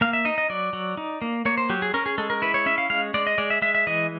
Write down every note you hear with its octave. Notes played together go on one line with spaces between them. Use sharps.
A#3 F5
E5
D#4 D#5
D#5
F#3 D5
F#3
D#4
A#3
A#3 C#5
C5
F#3 G4
G#4
C#4 A#4
G#4
G#3 A4
A#4
E4 B4
C#5
C#4 E5
F5
G#3 F5
G#3 D5
D#5
G#3 D5
E5
G#3 E5
E5
E3 D#5